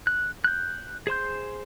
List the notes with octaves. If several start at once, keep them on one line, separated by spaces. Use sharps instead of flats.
F#6
F#6 G6
G#4 C5 C6 G6